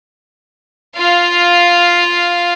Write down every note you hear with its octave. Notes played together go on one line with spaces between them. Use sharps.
F4 F5